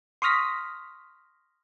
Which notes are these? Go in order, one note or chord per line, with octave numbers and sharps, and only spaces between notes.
C6 C#6 D#6 F6 A#6 B6